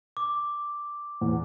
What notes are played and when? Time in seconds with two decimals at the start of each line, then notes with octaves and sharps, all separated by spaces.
0.17 D6
1.21 E2